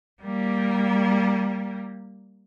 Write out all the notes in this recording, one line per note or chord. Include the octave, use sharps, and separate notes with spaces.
G3 A#3